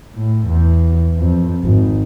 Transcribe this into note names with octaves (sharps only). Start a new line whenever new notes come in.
A2
E2
F2
G#1